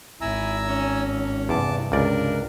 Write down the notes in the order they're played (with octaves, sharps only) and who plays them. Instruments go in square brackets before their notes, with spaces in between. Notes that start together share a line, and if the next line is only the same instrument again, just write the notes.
[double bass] G#1 [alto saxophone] E4 [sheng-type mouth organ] G#5 A#5 E6
[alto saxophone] C#4
[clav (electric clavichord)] E2 [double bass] G2 C3 [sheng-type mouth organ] A5 D6
[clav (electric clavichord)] C#2 D5 [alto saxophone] D4 [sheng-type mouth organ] A#4